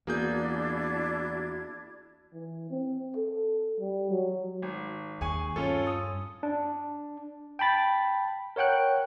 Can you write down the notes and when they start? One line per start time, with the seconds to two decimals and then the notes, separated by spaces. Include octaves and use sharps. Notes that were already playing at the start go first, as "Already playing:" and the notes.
0.07 E2 A#3 D4 E4 F#4 G#4 G6 G#6
2.33 E3
2.70 C4
3.16 A4
3.80 G3
4.11 F#3
4.62 G#1
5.21 D#2 G#4 G#5 C#6
5.56 G2 C#4 F4 A4
5.87 D#6
6.43 D4
7.59 G5 A5 B5 A6
8.56 A#4 C#5 F#5 G5 F#6